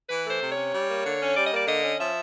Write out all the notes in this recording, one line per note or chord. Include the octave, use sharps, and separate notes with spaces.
E3 B4
A3 C5
C3
C#4 C#5
G3
A#3
D3
C#4
G3 D5
D#5
A#3 D5
D3 D#5
C#4
F3 E5